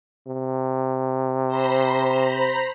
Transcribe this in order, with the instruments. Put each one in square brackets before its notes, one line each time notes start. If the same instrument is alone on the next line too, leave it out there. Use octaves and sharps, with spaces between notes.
[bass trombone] C3
[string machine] C5 A#5 B5